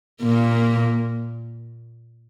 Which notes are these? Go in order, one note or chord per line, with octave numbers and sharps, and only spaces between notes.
A#2 A#3